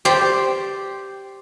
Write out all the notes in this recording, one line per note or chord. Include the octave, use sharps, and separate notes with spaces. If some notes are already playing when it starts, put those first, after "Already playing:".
G4 C5 D5 G5